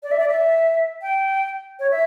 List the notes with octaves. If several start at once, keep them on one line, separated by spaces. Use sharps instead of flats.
D5
E5
D5
E5
G5
C#5
E5